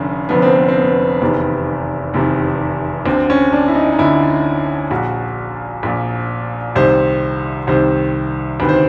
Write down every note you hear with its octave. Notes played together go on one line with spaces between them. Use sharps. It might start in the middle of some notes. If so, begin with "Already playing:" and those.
Already playing: F1 F2 D3 C#4
F1 F2 D3 B3
C4
B3
C4
B3
F1 E2 C3 D#3 B3
F1 E2 C3 D#3
D2 D3 C4
C#4
D4
E4
D#4
D#4
D2 D3 E4
A#1 A#2 F#4
A#1 A#2
C2 C3 D#3 C5
C2 C3 D#3 C5
D2 C3 D#3 B4
C5